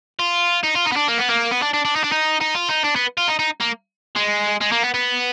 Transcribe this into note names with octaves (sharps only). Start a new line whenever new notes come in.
F4
D#4
F4
D#4
B3
D4
A#3
B3
A#3
B3
D4
D4
D4
D#4
D4
D#4
D#4
F4
D#4
D4
B3
F4
D#4
D#4
A#3
G#3
G#3
A#3
B3
B3